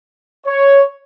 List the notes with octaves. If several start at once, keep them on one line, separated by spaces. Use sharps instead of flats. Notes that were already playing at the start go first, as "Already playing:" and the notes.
C#5